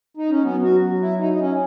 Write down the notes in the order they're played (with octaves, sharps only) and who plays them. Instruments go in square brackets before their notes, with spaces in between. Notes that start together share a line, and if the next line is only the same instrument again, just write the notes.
[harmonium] D#4
C#4
[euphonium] F#3 [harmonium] B3
[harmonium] F#4
E4
D#4
D#4
C#4